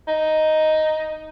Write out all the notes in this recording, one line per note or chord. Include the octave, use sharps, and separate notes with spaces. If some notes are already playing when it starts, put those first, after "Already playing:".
D#4